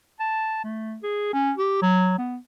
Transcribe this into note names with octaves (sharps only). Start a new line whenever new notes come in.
A5
A3
G#4
C#4
G4
F#3
B3